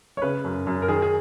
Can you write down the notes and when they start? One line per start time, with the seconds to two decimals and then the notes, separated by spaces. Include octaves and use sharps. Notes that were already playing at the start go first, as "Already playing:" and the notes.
0.17 C#5
0.22 C#3 B4
0.44 F#2
0.67 F#2
0.82 A#4
0.88 D#3 G#4
1.02 G#4